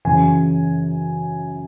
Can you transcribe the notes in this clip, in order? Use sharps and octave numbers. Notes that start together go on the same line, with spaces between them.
F#2 C#3 E3 G#5